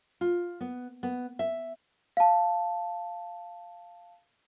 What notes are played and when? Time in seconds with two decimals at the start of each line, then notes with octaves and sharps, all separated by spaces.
0.21 F4
0.61 B3
1.03 B3
1.39 E5
2.17 F5 A5